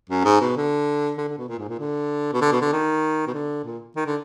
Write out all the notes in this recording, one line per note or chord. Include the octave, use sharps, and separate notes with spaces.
F#2
G#2
B2
D3
D3
D3
B2
A#2
G#2
A#2
D3
B2
D3
B2
D3
D#3
B2
D3
A#2
D#3
D3